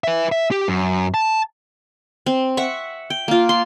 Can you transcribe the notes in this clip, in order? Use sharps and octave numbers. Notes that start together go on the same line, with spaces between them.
B4 E5
E5
G4
F#2
A5
C4
E5 F#5 C#6
G5
A#3 F4
C6